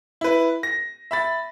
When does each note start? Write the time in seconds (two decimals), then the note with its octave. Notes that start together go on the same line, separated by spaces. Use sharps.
0.21 E4 B4
0.63 A#6
1.11 E5 B5 A6